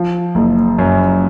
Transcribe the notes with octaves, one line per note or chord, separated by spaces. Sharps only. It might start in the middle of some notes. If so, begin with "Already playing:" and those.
Already playing: F3
F#1
F#2